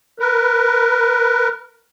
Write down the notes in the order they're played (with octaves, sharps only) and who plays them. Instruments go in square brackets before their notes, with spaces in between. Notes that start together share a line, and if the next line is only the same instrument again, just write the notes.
[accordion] A#4 B4